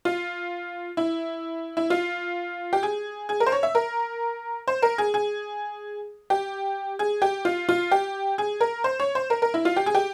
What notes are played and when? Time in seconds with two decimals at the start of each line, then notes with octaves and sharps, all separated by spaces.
0.05 F4
0.97 E4
1.77 E4
1.90 F4
2.73 G4
2.83 G#4
3.29 G#4
3.40 A#4
3.46 C5
3.52 C#5
3.63 E5
3.75 A#4
4.68 C5
4.82 A#4
4.98 G#4
5.14 G#4
6.30 G4
6.99 G#4
7.22 G4
7.45 F4
7.69 F4
7.91 G4
8.38 G#4
8.61 A#4
8.84 C5
9.00 C#5
9.15 C5
9.30 A#4
9.42 A#4
9.54 E4
9.65 F4
9.76 G4
9.86 G#4
9.95 G4